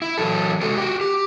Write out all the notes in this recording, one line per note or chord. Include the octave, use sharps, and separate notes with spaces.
E4
E3 F#3 A4
C3 G#3 F#4 A4
F#4 G4
G4